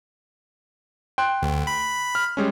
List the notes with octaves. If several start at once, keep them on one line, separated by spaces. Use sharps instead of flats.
G5 C6 F#6
D2
B5
F6
G3 G#3 C#4